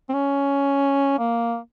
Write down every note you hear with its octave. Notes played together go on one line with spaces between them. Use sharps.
C4
C#4
A#3